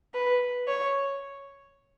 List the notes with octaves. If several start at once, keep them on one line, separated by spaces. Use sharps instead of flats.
B4
C#5